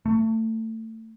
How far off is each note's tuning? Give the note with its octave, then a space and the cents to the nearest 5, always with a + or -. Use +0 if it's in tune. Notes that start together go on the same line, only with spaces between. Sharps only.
A3 +25